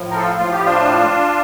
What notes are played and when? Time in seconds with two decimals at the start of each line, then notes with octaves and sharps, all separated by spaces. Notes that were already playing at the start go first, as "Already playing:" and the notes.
Already playing: A2 F3
0.11 A#4
0.16 F4 A4
0.39 A2 F3 F4
0.52 G4
0.65 D4 F4